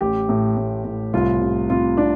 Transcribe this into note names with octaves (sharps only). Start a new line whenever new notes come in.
A1 G4
A2
A2
A2
C2 F4
C3
C3 F4
C3 D4